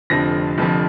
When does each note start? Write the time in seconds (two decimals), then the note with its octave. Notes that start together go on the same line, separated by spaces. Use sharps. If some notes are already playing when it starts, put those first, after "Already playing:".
0.10 F1 F2 D3 F3 A#6
0.58 F1 F2 D3 F3